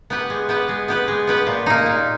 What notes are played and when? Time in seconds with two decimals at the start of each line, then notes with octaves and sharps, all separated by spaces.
0.10 B3 G4 B4
0.30 G#3
0.49 B3 G4 B4
0.69 G#3
0.88 B3 G4 B4
1.08 G#3
1.27 B3 G4 B4
1.47 A#2
1.66 A#3 D#4
1.86 A#2